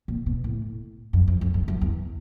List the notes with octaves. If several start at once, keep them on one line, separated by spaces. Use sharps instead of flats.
A#2
B2
A2
F#2
F2
F2
F#2
F#2
E2